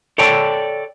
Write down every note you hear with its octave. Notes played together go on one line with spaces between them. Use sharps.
A4 C#5 D5 G5 A5